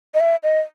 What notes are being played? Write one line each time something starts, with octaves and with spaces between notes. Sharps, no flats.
D#5
E5
D#5